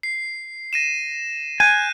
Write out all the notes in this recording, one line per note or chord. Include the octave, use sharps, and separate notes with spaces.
C7
A#6 D#7 E7
G#5 F#6 G6 D#7